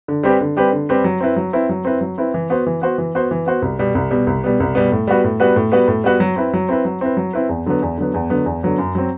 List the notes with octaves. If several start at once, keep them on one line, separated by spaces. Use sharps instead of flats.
D3
G3 C4 G4 B4
D3
G3 C4 G4 B4
D3
G3 C4 G4 B4
F#3
C4 E4 B4
F#3
C4 E4 B4
F#3
C4 E4 B4
F#3
C4 E4 B4
E3
B3 F#4 C5
E3
B3 F#4 C5
E3
B3 F#4 C5
E3
B3 F#4 C5
C2
B2 G3 B3
C2
B2 G3 B3
C2
B2 G3 B3
C2
B2 G3 B3
A2
G3 B3 F#4 B4
A2
G3 B3 F#4 B4
A2
G3 B3 F#4 B4
A2
G3 B3 F#4 B4
F#3
C4 E4 B4
F#3
C4 E4 B4
F#3
C4 E4 B4
F#3
C4 E4 B4
E2
D3 F#3 B3
E2
D3 F#3 B3
E2
D3 F#3 B3
E2
D3 F#3 B3
F#2
F#3 C4